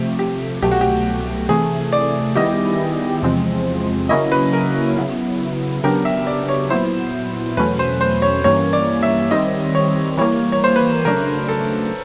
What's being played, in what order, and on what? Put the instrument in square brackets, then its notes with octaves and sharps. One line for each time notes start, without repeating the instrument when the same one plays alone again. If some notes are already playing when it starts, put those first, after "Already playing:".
Already playing: [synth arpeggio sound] C3 F3 A3 [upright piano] G4
[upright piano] G4
[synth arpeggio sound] C2 B2 F#3 A3 [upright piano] G4
[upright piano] F#4
G4
[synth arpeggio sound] C3 E3 A3 [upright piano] G#4
[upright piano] D5
[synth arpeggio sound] D#3 G3 B3 E4 G4 [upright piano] D#5
[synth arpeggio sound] E2 C3 F3 G#3 C4
[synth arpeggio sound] C#3 F#3 A#3 C#4 E4 [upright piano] D#5
[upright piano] B4
A#4
[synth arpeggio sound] C#3 F#3 B3 E4
[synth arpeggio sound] C#3 F#3 B3 D4 G4 [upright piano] A#4
[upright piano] E5
D5
C#5
[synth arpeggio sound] A#2 F#3 B3 E4 [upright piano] C5
[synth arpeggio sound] E2 B2 F#3 A3 C#4 [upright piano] B4
[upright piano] C5
C5
C#5
[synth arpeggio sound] G2 E3 G3 A#3 C#4 [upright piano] C#5
[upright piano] D5
E5
[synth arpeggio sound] D#3 G3 C4 [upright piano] D#5
[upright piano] C#5
[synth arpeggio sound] E3 G3 A#3 [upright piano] C#5
[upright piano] C#5
C5
B4
[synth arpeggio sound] C#3 F#3 A3 D4 [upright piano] A#4
[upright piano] A4